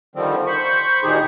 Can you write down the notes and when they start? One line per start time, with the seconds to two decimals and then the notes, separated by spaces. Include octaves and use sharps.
0.16 D3 D#3 F3 G3 C4
0.47 C5 B5 C#6
1.03 D2 A#2 D#3 D#4 G4 G#4